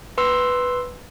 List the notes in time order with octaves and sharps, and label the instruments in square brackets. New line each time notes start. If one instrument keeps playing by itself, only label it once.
[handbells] B4 C6 E6